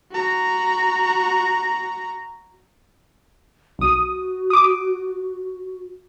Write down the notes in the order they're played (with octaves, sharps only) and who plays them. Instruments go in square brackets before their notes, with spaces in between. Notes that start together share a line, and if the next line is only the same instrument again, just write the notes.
[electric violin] F#4 A#5
[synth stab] B1 D#6 [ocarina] F#4
[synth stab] D6 D#6